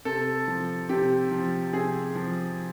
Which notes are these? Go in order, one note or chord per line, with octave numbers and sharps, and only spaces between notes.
C3 A4
F3
C3 G4
F3
C3 G#4
F3